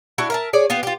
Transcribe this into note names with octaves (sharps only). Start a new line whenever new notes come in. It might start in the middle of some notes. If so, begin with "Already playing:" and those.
D4 E4 F#4
A#4 E5 A5
G#4 C#5 D5
B3 F4 G4
F4 G4